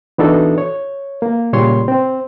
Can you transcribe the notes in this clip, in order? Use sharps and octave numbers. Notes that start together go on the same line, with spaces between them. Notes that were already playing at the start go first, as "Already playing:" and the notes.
E3 B3 D4 D#4 F#4 A4
C#5
A#3
A#2 C#3 G3 C#5 C6
C4